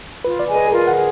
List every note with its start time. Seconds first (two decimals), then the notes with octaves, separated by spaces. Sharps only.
0.24 F4 B4
0.40 D5
0.48 G#4 D#5 G#5
0.56 B4
0.68 G#4
0.72 F4 A#4
0.87 F#5
0.96 G#4